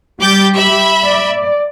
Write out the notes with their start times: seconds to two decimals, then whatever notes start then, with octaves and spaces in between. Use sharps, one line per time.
0.21 G3 G4 D6 G6 A6
0.56 E5 B5
1.04 D5